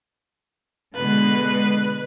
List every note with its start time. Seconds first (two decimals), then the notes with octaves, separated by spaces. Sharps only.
0.95 B2 D3 G#3 B4